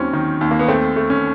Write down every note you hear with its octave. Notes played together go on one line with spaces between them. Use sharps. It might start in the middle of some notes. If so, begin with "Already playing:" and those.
Already playing: D#2 D#3 F#3 C4 C#4
D#3
D#2
A#3
B3
A3 C4
A3
C#4